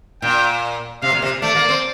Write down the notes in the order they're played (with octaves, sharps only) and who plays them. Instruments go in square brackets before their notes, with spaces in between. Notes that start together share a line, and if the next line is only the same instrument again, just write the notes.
[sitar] A#2 [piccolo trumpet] G5
[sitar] C3 [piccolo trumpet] F5
[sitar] A#2
C3
[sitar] A3 [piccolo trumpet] D5
[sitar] A#3
C4